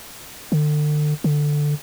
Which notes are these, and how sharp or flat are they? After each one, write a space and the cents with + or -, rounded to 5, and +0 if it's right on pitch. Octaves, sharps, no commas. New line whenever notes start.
D3 +35
D3 +5